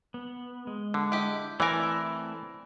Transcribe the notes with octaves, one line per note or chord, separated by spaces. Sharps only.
B3
G#3
D3
E4 G4 D#5
E3 A3 C4 E4 A#4 D5 G#5